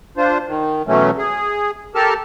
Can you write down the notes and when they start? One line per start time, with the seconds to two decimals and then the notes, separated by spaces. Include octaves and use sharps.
0.17 D4 F4 C5
0.47 D#3
0.87 B2 E3 F#3 A3 C#4
1.18 G#4
1.95 G4 A4 A#4 A5 F6